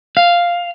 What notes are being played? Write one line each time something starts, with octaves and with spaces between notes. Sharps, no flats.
F5